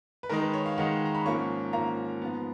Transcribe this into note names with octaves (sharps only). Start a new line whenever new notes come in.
B4
D#3 G#3 D#4 A#4
B4
C#5
F5
D#3 G#3 D#4 F#5
A#5
B5
G#2 F3 A#3 C#4 C#6
G#2 F3 A#3 C#4 A#5
G#2 F3 B3